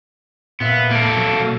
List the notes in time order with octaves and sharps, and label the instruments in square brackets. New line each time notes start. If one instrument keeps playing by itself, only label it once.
[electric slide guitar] A#2 E5 F5 [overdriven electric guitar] B3
[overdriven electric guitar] A#3 A4
[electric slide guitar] B2 F#3